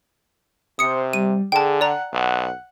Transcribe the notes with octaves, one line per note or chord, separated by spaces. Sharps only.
C3 C5 D#6 C#7
G3 D#7
D3 G#4 G5 A5
D5 F#5 A#5
B1 F#5